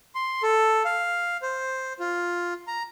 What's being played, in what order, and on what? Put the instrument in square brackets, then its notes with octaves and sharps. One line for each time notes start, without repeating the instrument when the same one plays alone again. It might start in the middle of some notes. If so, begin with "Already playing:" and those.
[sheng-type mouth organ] C6
A4
F5
C5
F4
A#5